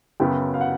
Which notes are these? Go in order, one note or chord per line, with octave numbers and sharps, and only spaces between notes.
F#2 C#3 F#3 B3 G5
F5
F#5